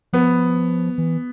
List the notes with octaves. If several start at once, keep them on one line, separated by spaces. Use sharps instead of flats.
F3 B3
E3